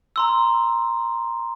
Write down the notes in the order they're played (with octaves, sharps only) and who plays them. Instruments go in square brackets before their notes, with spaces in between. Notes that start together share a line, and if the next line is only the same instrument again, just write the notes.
[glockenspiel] A#5 C6 E6